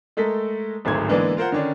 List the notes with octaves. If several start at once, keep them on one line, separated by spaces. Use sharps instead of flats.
G#3 A3 A4 A#4 B6
D1 G#1 G#2 A3 G#6
D3 E3 G#3 A#3 B3 D4
F4 A#4 C5 F#5
D3 D#3 C#4 D4